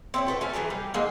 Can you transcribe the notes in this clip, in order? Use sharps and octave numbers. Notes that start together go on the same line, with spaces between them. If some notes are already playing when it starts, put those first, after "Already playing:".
C4 E4 C#5
F#4 A4 B4 G5
A3 C#4 A5
E3 F#3 G#4 A#4
G3 G4
F#3 G#3 A#3 D#4